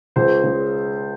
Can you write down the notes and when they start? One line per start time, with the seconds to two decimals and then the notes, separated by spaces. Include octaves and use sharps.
0.16 C#2 C5
0.43 C#3